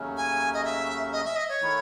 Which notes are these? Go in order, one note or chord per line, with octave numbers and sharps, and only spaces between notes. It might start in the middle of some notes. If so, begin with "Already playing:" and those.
Already playing: D#2 C#3 F#3 A3 C#4
G#5
D#5
E5
D#5
E5
D#5
C#5
D#3 A3 E4